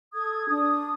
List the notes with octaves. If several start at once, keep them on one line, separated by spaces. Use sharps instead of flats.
A4 D#6 G#6
D4 D#6